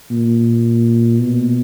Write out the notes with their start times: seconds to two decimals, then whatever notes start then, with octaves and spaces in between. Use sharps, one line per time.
0.11 A#2
1.19 B2